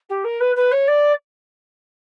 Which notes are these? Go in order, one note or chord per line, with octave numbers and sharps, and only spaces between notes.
G4
A#4
B4
B4
C#5
D5